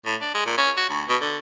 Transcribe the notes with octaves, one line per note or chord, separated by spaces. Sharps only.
A2
D4
G#3
A#2
C#4
F#4
D2
B2
D3